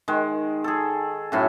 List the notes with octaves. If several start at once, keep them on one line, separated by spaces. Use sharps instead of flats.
D#3 G#3
G#4 A4
F#2 A2 E4 C#6